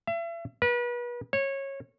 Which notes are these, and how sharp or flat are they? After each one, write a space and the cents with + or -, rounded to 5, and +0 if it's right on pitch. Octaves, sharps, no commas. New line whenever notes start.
E5 +40
B4 -35
C#5 -20